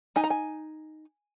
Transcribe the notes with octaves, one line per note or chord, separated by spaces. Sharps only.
D#4 G#5
A#5
G#5